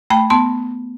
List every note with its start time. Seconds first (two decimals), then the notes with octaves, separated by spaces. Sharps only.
0.10 A3 G5 B5
0.30 B3 A5 C6